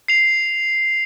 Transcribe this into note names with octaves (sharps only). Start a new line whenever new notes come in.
C7 F7